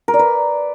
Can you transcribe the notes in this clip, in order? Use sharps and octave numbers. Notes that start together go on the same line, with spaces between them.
A#4
D5
B4